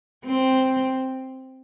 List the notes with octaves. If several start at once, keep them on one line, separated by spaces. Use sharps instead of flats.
C4